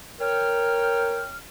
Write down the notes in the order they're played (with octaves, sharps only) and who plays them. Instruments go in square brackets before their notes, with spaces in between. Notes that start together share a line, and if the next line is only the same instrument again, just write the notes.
[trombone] A#4 [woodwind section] C#5 G5 F6